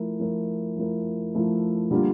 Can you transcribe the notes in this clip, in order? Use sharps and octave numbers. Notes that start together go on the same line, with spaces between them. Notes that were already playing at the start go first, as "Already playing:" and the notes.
Already playing: F3 A3 E4 A#4
F3 A3 E4 A#4
F3 A3 E4 A#4
F3 A3 E4 A#4
D3 G3 A#3 F4